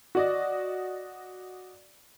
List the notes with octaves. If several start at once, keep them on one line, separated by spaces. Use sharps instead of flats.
F#4 D5 D#5